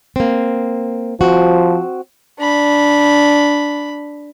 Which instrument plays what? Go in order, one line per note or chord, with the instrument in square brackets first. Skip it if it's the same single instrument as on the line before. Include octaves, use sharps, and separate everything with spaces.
[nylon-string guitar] A#3 C4
[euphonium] F3 [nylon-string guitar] C4 F#4
[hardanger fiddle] D4 B5